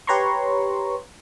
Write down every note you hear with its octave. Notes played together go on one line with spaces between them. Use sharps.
G4 B4 C#5 A#5 C6 C#6